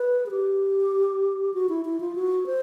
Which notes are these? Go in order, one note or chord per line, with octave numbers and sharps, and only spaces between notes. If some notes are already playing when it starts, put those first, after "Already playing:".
Already playing: B4
G#4
G4
F#4
E4
E4
F4
F#4
C5